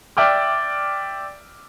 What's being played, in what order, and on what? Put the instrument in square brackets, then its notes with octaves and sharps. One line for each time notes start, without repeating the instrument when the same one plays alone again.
[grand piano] D5 E5 G5 D6 F6